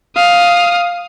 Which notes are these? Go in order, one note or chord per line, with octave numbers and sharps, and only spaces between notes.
F5 D#6